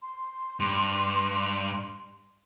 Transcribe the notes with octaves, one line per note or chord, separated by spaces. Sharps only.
C6
G2